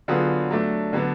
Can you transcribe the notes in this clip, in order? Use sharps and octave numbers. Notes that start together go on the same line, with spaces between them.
D3 F#3 B3 F4 G#4
F#3 A3 D4
D3 F#3 B3 D4